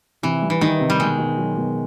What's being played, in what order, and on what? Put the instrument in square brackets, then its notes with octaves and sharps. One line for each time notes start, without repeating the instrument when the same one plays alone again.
[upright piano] C3 [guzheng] E3
[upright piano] G3
[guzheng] E3
[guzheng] D#3 [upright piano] G3
[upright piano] C3
[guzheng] G3
[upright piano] B2 [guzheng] G#3
[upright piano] B2
F#3
B2